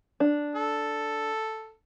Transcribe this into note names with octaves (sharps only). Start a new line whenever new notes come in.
D4
A4